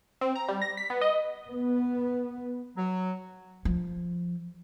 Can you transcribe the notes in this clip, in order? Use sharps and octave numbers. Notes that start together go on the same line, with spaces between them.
C4
A#5
G3
A#6
B6
B3
D#5
B3
F#3
F3